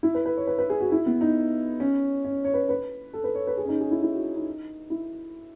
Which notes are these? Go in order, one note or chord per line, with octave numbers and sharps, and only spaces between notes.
E4
B4
B4
C#5
B4
B4
G#4
F#4
E4
B3
D#4
C#4
C#4
C#5
B4
B4
A4
B4
C#5
B4
G#4
C#4
D#4
G#4
E4
E4
F#4
D#4
E4